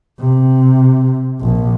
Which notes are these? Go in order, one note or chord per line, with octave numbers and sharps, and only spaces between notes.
C3
A#1